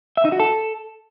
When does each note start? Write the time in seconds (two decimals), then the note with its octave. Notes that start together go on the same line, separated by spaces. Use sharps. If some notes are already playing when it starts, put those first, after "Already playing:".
0.17 E5
0.25 D#4
0.32 F#4
0.40 A4